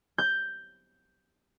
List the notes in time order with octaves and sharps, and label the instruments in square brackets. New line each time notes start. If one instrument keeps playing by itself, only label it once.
[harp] G6